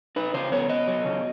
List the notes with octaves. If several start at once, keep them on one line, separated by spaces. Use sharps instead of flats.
D#4 B4
C#3 C5
B3 C#5
B3 D#5
F#3
C#3